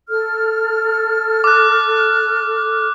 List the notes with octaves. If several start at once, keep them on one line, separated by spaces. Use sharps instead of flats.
A4 F6
D6 F#6